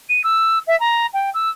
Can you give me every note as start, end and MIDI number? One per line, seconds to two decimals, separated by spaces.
0.09 0.20 99
0.23 0.58 88
0.67 0.78 76
0.79 1.06 82
1.13 1.30 79
1.34 1.49 88